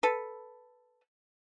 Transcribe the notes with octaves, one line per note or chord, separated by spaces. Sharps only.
A4 B4